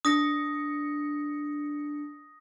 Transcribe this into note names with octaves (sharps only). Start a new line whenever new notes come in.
D4 D#6 A#6 C#7